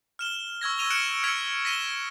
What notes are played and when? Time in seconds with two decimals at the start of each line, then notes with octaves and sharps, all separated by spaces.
0.19 F6 E7 G7
0.61 C#6 E6 G#6 A#6
0.78 C#6 E6 A#6 D#7 F7 G7
0.90 F6 F#6 C#7 D7 E7 F#7
1.23 E6 F6 G#6 B6 C#7 F7
1.65 A#6 B6 D#7 E7 G7